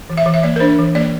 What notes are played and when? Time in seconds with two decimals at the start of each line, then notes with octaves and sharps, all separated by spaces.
0.10 E3
0.17 E5
0.26 E3
0.34 E5
0.43 A#3 D5
0.56 A#4
0.60 D4 C5
0.78 E3
0.95 A#3 D5